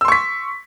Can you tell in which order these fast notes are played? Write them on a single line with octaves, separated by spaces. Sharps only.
E6 C6 C#6 B6